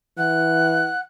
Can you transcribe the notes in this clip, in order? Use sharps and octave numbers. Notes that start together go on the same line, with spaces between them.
E3 F#5 F#6